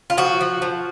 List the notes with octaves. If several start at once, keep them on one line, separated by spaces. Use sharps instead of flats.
F4
F3 F#4
F3
F3